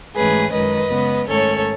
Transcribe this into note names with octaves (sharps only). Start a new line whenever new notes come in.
G#2 E3 A3 C#4 G#4 B4
F#2 D#3 G#3 B4 D#5
C#3 G#3 B3
G#2 D#3 A3 C#4 A4 C#5